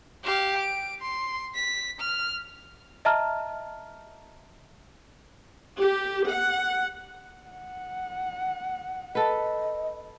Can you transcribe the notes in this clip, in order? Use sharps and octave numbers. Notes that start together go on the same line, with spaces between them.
G4 F5
D7
C6
B6
F6
D#5 E5 A5 A#5 F6
G4
F#5
F#5
A4 B4 D#5